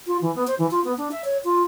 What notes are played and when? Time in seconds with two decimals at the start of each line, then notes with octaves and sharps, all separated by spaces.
0.07 F4
0.21 E3
0.35 B3
0.47 C5
0.59 E3
0.71 F4
0.85 B3
0.98 D4
1.11 E5
1.25 C#5
1.45 F4